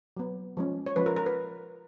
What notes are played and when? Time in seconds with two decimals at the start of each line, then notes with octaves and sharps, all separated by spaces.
0.17 F#3 B3
0.57 F3 G#3 C#4
0.86 C#5
0.96 F3 G#3 C#4 B4
1.06 A#4
1.16 A#4
1.26 B4